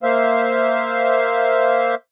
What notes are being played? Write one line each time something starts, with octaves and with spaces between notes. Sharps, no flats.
A#3 C5 E5 F5